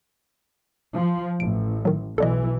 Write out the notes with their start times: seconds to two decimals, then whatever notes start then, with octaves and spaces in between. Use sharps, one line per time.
0.95 F3
1.40 A1 D7
1.85 D#3 F#3
2.18 B1 E3 A4 D5 D#5